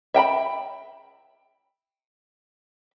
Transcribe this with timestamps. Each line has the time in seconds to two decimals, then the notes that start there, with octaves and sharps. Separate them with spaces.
0.14 E5 G5 A#5 B5